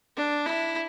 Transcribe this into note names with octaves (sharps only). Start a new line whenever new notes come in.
D4
E4